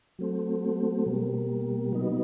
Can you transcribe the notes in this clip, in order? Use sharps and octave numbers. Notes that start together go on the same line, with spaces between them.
F#3 A3 C4
B2 G3 A#3
F#3 B3 D#4